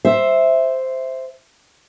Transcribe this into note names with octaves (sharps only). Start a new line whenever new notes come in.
C5 E5